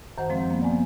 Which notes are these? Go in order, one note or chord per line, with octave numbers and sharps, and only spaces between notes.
F#2 D#3 C5 F#5
F3 G#3 C4
A#3 B3
D5 G#5